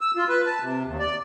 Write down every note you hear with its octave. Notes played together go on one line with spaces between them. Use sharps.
E6
F4
B4
A5
C3
D#2
D5